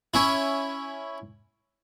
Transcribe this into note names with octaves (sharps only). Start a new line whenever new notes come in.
C#4 E4